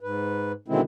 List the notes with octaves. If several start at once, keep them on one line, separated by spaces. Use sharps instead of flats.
G#2 B4
B2 D3 D#3 G#3 C4 E4